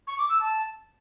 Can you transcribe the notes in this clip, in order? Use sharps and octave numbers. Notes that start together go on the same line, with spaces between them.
C#6
D6
E6
A5